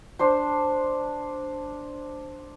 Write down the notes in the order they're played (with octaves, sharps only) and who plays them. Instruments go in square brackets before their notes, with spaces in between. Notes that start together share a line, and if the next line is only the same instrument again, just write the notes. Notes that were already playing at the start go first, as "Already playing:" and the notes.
[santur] D4 C5 C6